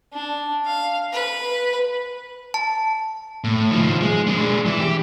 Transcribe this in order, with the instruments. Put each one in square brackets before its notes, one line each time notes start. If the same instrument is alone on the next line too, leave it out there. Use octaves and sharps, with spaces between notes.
[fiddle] D4
F5
B4
[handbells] A5
[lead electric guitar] A2
D#3 F3
G#3
G#3 D4
E3 E4
G4